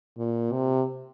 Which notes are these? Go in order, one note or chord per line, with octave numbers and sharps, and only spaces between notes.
A#2
C3